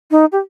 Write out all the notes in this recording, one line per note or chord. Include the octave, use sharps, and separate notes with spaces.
D#4
G4